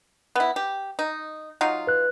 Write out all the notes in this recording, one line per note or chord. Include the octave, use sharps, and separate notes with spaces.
B3 E4
G4
D#4
F#3 D#4 F4
B4 F#6